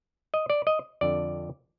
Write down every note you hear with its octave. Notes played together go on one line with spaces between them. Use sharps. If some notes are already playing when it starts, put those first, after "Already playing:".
D#5
D5
D#5
F2 D3 D5